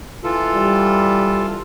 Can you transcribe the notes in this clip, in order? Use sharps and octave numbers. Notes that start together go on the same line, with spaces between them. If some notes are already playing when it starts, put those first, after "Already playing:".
E3 F4 A4
G3